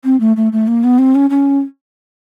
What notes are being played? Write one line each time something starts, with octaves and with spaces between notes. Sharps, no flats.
C4
A3
A3
A3
A#3
B3
C4
C#4
C#4